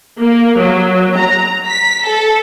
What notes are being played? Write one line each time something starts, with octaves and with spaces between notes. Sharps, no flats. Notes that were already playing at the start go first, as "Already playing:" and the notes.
A#3
F#3
A#5
B6
A4